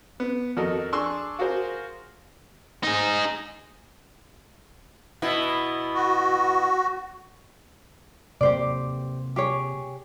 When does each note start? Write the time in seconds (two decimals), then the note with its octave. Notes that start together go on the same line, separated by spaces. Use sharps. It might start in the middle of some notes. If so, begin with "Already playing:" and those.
0.20 B3
0.57 F2 F#4 A4 A#4 D#5
0.92 D4 G#4 C6 C#6 E6
1.39 F4 F#4 G#4 A#4 C5
2.83 D#4 G#4
5.22 B2 B3 E4
5.94 F#4
8.41 C3 F#3 A#3 G4 C5 D5
9.36 G4 G#4 C#5